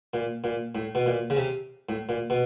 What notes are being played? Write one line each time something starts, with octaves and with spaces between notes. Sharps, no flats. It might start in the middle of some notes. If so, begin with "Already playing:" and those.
A#2
A#2
A2
B2
A#2
C#3
C3
A2
A#2
B2